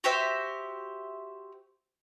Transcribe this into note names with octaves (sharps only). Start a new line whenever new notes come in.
F#4 G4 C5 E5